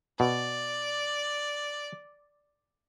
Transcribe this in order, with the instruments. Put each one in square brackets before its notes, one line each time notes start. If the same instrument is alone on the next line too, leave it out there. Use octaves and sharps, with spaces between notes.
[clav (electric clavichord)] B2 [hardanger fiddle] D5